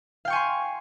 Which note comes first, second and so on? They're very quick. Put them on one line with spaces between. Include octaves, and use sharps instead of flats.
F5 G5 C#6 G#5 C6